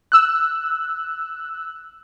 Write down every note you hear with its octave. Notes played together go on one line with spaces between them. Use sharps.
E6 F#6